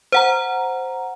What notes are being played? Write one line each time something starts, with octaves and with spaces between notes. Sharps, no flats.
C5 F#5 A#5